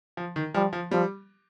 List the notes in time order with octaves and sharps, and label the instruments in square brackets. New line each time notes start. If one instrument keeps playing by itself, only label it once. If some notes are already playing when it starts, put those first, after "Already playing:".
[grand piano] F3
D#3
[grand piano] F3 [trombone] G3
[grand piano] F3
[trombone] F3 [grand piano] G3